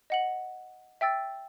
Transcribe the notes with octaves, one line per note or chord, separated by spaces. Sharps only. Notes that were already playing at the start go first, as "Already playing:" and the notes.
D#5 F#5 F#7
E5 G5 E6 A6